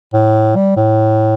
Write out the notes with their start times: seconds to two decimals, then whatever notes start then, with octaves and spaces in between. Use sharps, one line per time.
0.13 A2
0.56 G3
0.77 A2